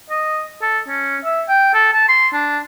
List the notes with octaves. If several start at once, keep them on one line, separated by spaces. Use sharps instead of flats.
D#5
A4
C#4
E5
G5
A4
A5
C6
D4